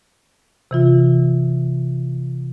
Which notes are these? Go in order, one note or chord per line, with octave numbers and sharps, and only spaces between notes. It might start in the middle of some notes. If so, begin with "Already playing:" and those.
C3 E3 F4